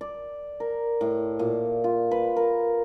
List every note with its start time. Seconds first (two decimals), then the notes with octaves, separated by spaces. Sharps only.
0.01 D5
0.60 A#4
1.01 A2
1.39 A#2
1.84 F4
2.11 B4
2.36 A#4